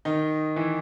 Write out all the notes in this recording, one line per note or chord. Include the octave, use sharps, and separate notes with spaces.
D#3 D#4
E3 E4